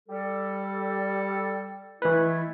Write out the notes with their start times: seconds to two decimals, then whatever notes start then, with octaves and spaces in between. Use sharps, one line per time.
0.08 G3 A4
2.02 E3 G#3 A3 E4 B4